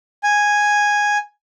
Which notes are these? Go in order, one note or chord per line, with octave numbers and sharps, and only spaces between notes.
G#5